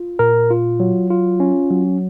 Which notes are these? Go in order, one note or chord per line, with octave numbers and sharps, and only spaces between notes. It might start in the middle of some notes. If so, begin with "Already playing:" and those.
Already playing: F4
A#2 A#4
F4
F#3
F4
C#4
F#3